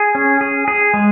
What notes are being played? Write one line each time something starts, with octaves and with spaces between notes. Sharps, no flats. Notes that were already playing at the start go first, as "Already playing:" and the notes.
Already playing: G#4
C#4
G#4
G#4
G#3